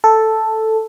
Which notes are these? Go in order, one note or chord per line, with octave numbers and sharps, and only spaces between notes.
A4